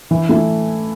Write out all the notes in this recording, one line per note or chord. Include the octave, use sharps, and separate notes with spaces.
E3
A3 E4